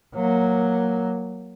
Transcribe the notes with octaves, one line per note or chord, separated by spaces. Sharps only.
F#3 A#3